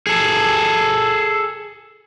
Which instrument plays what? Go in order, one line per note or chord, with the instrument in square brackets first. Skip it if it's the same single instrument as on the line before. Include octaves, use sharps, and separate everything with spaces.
[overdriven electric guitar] G#4 A4